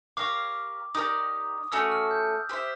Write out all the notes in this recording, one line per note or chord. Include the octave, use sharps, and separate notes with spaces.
G4 A#4 C#5 F5 D6
D#4 G4 A#4 D5 D#6
A3 C#4 F#4 E6
F6
G6
G4 C5 E5